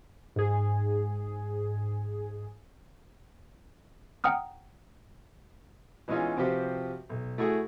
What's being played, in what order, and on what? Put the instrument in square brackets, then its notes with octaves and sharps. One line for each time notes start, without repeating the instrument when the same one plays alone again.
[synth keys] G#2 G#4
[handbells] F#5 G5 A#5 D#6 F6
[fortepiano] E3 G#3 B3 C#4 D#4 F4
C3 F3 C4 F#4 G4 B4
B1
A3 E4 F#4 G#4 F#5